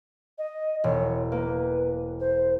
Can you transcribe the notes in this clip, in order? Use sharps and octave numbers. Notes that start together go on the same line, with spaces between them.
D#5
E1 C#5
A#3 B4
C5